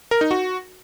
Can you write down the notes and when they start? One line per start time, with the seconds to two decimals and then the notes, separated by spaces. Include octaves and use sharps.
0.11 A#4
0.21 D#4
0.31 F#4